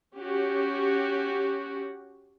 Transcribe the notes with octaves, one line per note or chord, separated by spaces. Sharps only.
C#4 F#4 G4